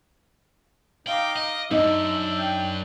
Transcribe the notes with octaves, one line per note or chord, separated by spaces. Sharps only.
D#4 F5 G5 D6
D#5
F#2 D4 D#4 E5
G5